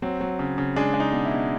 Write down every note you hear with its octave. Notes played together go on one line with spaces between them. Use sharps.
F#3 C4
F#3
C#3
C#3
G#3 D4
G#3
D#4
B2
E4
B2